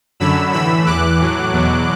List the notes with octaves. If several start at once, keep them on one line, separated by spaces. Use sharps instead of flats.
F#2 D3 F#3 B5 E6
A2 E3 B5 E6
E2 E3 D6 F#6
A2 F#3
E2 B2 F#3